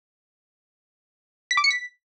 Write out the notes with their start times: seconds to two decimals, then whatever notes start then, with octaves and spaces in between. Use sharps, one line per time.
1.51 B6
1.57 D6
1.64 C#7
1.71 B6